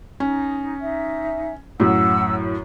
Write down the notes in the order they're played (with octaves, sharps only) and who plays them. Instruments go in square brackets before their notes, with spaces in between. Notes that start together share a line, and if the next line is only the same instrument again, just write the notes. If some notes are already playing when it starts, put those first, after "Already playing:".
[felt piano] C#4 [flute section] D#4
[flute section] D#4 E5
[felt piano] F#2 A2 [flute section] F#5 E6